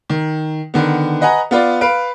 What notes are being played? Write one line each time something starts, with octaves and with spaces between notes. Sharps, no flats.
D#3
D3 D#3 B3
B4 D#5 F#5 G#5 A#5
B3 F4 D5
B4 F5 D7